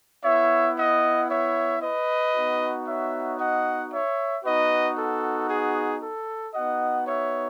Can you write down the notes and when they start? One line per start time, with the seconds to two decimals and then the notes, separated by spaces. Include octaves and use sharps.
0.24 B3 E4 C#5 E5
0.78 D#5 F#5
1.30 C#5 E5
1.82 B4 D#5
2.35 B3 D#4 F#4
2.88 C#5 E5
3.39 D#5 F#5
3.93 C#5 E5
4.45 B3 D#4 F#4 B4 D#5
4.97 A4
5.49 G#4
6.02 A4
6.54 B3 D#4 F#4 D#5 F#5
7.06 C#5 E5